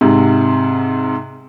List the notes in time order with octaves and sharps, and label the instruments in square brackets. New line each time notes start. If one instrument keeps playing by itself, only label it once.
[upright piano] G#2 C3